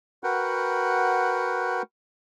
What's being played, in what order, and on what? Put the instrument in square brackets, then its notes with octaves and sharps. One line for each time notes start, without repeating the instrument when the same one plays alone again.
[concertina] F#4 A#4 B4 F#5 G5